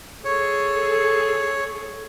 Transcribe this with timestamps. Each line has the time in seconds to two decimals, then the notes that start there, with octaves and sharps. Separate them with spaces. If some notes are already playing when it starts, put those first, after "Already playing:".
0.25 G#4 A4 C#5